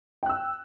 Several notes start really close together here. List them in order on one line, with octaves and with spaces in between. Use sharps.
G5 F#6 E6